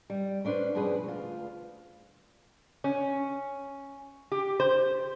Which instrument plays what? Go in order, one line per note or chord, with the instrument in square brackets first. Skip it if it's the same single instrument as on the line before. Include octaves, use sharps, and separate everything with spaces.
[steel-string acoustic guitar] G3
C#4 D4 E4 B4 C5
G2 B2 F3 G#4 B4
D2 F4
[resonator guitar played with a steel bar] C#4
G4
C5